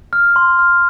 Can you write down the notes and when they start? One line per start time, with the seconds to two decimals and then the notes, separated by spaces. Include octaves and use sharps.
0.13 F6
0.36 C6
0.59 F6